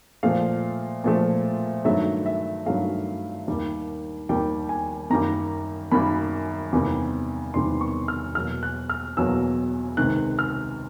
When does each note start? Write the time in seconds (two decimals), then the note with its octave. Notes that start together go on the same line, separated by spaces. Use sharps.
0.23 A#2 F3 A3 F5
1.04 A#2 F3 A3
1.85 G2 D#3 F#3 A3 E5
2.26 E5
2.66 G2 D#3 F#3 A3 F5
3.48 D#2 D#3 G3 A#3
4.29 D#2 D#3 G3 A#3 G5
4.69 G#5
5.10 F#2 D#3 G3 A#3 A#5
5.92 F#2 D#3 G3 A#3 B5
6.72 E2 C3 D#3 G3 A#3
7.54 E2 C3 D#3 G3 A#3 C6
7.81 C#6
8.08 F6
8.35 E2 B2 F#3 A#3 F6
8.63 F#6
8.89 F6
9.17 E2 B2 F#3 A#3 E6
9.97 C#2 C3 D#3 F#6
10.39 F6